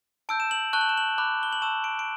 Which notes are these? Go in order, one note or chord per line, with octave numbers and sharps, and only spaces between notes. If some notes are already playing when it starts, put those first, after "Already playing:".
A5 E6 G6 D7
E7
F#7
A5 C#6 F#6 G7
F#7
E7
F#7
B5 D6 F#6
G7
F#7
A5 C#6 E6 E7
D7
D7